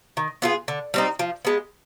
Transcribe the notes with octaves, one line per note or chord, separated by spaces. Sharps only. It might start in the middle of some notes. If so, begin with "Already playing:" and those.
D#3
B3 F4 G#4
D3
G3 C4 D#4
F3
G#3 B3